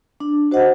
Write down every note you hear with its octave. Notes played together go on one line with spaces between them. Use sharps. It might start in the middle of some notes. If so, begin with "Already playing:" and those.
D4
F#4 C5 D#5 F#5